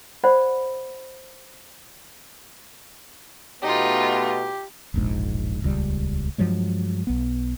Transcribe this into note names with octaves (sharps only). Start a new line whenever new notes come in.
C5 D5 F#5 B5
B2 A3 B3 D#4 F4 G4
E1 A#1 G#2
D#1 C#2 G3
G2 F3 F#3 G#3
B1 B3